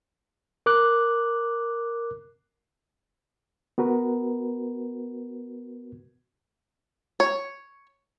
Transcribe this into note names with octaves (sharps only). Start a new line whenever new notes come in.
A#4 D6 F#6
B3 F#4 A#4 B4
C#5